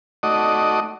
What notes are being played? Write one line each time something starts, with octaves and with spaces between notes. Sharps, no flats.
A3 D#4 F#4 D5 D#5